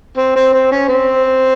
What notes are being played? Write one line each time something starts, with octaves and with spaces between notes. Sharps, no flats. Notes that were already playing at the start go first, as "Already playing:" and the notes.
C4
C4
C4
C#4
C4